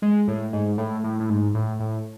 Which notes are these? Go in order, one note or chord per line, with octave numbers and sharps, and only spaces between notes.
G#3
A2
G#2
A2
A2
A2
G#2
A2
A2